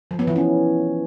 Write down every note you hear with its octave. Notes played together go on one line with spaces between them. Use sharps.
F3
B3
E3
C#4